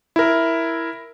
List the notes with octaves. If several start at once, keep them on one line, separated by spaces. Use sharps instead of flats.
E4 A#4